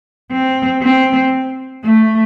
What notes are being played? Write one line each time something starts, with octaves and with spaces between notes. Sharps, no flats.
C4
C4
A3